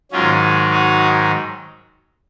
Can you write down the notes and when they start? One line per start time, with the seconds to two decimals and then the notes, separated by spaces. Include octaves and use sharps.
0.12 G#2 D#3 F#3 C#4 F4
0.71 D#4 F#4